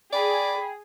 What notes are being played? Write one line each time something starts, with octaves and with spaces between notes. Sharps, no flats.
G#4 D5 G5 B5